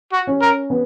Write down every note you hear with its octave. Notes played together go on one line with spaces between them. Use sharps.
F#4
C#4
A#4
B3